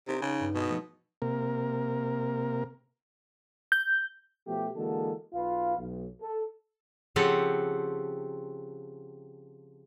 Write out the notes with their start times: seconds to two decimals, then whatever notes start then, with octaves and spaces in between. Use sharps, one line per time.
0.08 C3 D#4
0.22 C#3
0.40 G2
0.55 B2 G#3 G#4 D#5
0.68 F3 A3
1.22 C3 A#3 A#4
3.72 G6
4.47 B2 F3 A3 B3 G4
4.76 D3 E3 G#3 A#3 F#4 A4
5.34 B1 F4 B4 F5
5.79 B1
6.21 A4
7.16 C#3 F3 C4 G4 A4 F#5